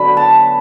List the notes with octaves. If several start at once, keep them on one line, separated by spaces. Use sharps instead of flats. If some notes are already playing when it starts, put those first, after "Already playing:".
Already playing: D3 F#3 B3 D4 B5
A5